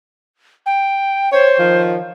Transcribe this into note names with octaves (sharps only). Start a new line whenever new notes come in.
G5
C5 C#5
D#3 F3